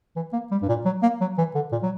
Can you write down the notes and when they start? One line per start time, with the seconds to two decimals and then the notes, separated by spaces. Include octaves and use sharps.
0.16 E3
0.33 A#3
0.51 G3
0.62 G2
0.69 A#2
0.85 F#3
1.02 A#3
1.21 F#3
1.38 E3
1.55 D3
1.72 A#2
1.83 F#3